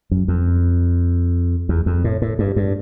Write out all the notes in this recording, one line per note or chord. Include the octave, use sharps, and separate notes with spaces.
F#2
F2
E2
F2
A2
A2
G2
G2